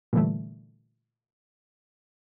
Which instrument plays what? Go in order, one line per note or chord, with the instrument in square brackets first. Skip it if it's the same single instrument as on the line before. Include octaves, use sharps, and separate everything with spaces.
[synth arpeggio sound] A#2 D3 E3 G3 A3